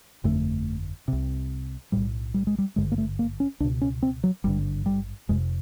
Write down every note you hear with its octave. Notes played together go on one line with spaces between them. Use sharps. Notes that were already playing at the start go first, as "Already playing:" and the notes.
G1 F2 D3 A3
C2 C3
B1 A2 G3
G3
G#3
G3
G#1 G2 D3 G#3
A#3
A3
A#3
C#4
C#2 B2 D4
C#4
C4
F#3
G#1 G2 D3 G3
G3
F1 F2 C3 G#3